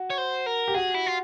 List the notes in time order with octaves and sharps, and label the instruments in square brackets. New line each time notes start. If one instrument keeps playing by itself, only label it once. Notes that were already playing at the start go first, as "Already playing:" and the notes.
Already playing: [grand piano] F#4
[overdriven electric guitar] C#5
C5
A#4
[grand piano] G4
[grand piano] F#4 [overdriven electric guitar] G#4
[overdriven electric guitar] E4
F4